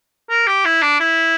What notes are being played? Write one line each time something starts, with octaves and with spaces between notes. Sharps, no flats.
A#4
G4
E4
D4
E4